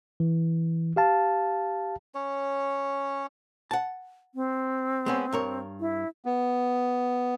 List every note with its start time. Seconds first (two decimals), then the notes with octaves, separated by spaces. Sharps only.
0.20 E3
0.96 G4 F5 A5
2.15 C#4 C#5
3.71 F#5 A5
4.35 C4
5.06 G#3 B3 C#4
5.32 G2 A#4 C#5
5.80 E4
6.25 B3